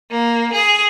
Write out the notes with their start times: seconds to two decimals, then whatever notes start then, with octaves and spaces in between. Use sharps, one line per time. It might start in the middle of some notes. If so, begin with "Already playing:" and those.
0.10 A#3
0.53 G#4